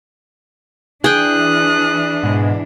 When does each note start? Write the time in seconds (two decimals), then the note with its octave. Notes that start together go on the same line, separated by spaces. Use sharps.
1.04 E3 D4 G#4 G5 D#6 F#6
2.23 G#2 B2 G#3